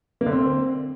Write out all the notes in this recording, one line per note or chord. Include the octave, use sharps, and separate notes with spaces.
A#3
D3
C4